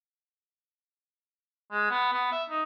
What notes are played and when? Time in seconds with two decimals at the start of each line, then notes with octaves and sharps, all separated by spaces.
1.71 G#3
1.91 B3
2.13 B3
2.32 E5
2.50 D#4